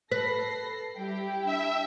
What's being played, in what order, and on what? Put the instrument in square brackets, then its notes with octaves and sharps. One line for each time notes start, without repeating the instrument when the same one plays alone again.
[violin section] A4 A#6 C7 [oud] B4
[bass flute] G3 [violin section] E4 G4 G5
[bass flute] D4 [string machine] E5